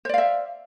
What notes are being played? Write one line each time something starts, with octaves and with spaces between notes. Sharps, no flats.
C5 D5 E5 F5